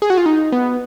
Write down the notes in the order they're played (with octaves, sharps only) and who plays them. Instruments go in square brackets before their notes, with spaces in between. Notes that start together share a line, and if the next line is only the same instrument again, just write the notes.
[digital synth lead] G#4
F#4
F4
D#4
B3